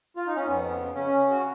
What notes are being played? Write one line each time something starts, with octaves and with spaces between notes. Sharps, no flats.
F4
D#4
C#4
F2 B3
C#3
C#3 C#4
C#3
F#4